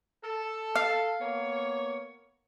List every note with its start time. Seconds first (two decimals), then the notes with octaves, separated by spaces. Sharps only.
0.23 A4
0.76 F5
1.20 A#3 B3 C#5